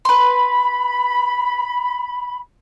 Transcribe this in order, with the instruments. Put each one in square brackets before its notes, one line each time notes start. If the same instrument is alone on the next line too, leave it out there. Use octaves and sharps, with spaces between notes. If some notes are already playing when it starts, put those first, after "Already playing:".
[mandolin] B4 C6 [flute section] B5